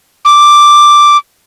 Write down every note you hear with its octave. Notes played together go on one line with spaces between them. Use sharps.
D6